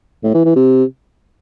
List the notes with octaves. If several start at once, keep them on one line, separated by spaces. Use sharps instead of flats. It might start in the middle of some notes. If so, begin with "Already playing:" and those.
A2
E3
E3
C3